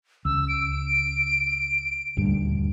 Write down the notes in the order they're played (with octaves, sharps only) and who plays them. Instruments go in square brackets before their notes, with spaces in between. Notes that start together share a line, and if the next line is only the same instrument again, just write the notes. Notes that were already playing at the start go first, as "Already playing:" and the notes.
[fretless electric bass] C#2 [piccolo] E6
[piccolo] D7
[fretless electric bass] D#1 D2 G2